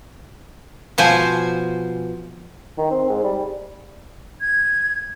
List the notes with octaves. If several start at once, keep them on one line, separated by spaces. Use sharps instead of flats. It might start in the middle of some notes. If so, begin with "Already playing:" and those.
B2 F3 C5 G#5
D#3
C4
G#2
G3
G#6